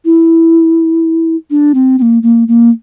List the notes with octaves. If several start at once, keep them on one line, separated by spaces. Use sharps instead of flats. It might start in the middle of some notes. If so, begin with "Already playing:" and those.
E4
D4
C4
C4
A#3
A#3
A#3